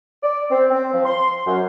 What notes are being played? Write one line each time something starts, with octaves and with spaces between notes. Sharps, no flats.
D5
C4
C4
F3
C6
F#2